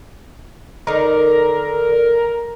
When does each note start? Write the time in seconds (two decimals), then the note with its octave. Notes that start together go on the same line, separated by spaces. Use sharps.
0.87 D3 D#4 A#4